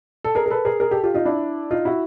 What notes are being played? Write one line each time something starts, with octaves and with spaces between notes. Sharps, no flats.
A4
G#4 A#4
A#4
A4 B4
G#4 A#4
G#4 A#4
G4 A4
F4 G4
D#4 F4
D4 E4
D#4 F4
E4 F#4